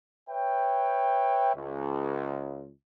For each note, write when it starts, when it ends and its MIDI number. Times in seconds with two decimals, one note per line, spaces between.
0.29 1.51 71
0.29 1.51 73
0.29 1.51 76
0.29 1.51 79
1.55 2.69 37